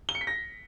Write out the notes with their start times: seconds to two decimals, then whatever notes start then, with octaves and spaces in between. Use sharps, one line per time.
0.09 G7
0.15 C#7
0.21 B6
0.27 A#6